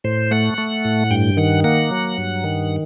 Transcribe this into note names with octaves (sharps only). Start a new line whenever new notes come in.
A2 C5
A3 F#5
A3
A2
G2 G5
D#3 F#5
A#3 F#5
F#3
G2
D#3